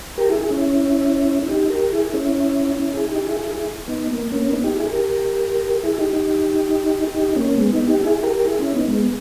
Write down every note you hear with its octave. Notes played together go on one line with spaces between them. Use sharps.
G4 A#4
E4 G#4
E4 G#4
C#4 E4
E4
D#4 G4
G4 A#4
E4 G#4
C#4 E4
C#4 E4
E4 G#4
D#4 G4
E4 G#4
E4 G#4
E4 G#4
B3 D#4
A#3
A#3 C#4
B3 D#4
D#4 G4
E4 G#4
G4 A#4
E4 G#4
D#4 G4
D#4 G4
D#4 G4
A#3 C#4
G#3 B3
B3 D#4
D#4 G4
E4 G#4
G4 A#4
E4 G#4
C#4 E4
B3 D#4
G#3 B3